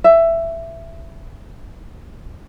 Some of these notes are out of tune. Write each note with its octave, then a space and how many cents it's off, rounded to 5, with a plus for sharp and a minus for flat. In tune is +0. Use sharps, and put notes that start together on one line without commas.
E5 +10